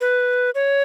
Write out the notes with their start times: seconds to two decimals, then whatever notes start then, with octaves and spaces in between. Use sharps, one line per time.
0.01 B4
0.55 C#5